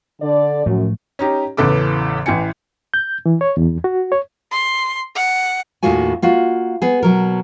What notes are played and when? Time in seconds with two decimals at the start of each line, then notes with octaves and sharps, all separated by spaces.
0.22 D3 D5
0.66 F#2 A2 F3 A3
1.19 C#4 D#4 G4
1.57 A1 E2 C#3 A4 B4 D6
2.26 A1 E3 G5 G#5 C#7
2.94 G6
3.26 E3
3.41 C#5
3.57 E2
3.84 F#4
4.12 C#5
4.51 C6
5.15 F#5
5.83 D#2 A2 D#3 F4 F#4 G#5
6.22 A#3 F4 F#4
6.82 B3 G#4
7.03 B2 F#3 A#4